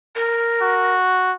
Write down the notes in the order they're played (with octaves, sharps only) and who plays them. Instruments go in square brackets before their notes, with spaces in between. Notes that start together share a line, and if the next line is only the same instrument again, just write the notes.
[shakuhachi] A#4
[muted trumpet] F#4